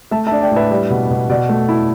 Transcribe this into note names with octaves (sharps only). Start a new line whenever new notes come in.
A3 E5 A5
E5 A5
D4
D5 G5
A2
B4 E5
G3
B2
B2
B2 D5
A3
E4